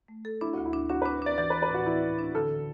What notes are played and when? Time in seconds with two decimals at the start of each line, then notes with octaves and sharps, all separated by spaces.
0.08 A3
0.25 A4
0.41 D4 E4
0.53 D2 F#4
0.66 E4
0.73 D4
0.90 D4 F#4
1.02 D4 B4
1.22 D4 D5
1.38 E3 D5
1.50 B4
1.54 E3
1.62 B4
1.70 A2 F#4
1.86 E3 E4
2.02 A2
2.19 D4
2.35 D3 A4